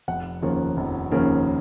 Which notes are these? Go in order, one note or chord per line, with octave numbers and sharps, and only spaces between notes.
F1 F#5
D#2 C#3 F3 A#3
F1
D#2 C#3 F3 A#3